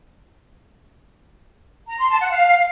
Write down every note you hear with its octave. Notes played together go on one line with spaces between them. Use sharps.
A#5
C6
A5
F#5
F5